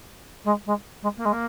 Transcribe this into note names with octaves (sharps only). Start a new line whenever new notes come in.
G#3
G#3
G#3
A#3
G#3
A#3